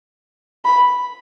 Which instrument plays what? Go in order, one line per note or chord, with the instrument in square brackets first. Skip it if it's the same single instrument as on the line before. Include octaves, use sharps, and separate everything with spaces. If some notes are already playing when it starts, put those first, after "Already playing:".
[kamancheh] B5